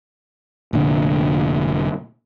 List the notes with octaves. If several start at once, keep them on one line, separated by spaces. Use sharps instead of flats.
F1 A#2 D3